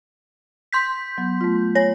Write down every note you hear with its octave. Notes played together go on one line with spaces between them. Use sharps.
C6 G6 B6
F#3 B3
A3 F4
C#5 G#5 A#6